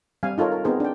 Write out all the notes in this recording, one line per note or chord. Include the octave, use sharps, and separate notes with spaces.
G3 C4 F5 G#5
D#4 F4 A4 A#4 C#5
A#4
B3 C4 D#4 G#4 A#4 C5
D4 G5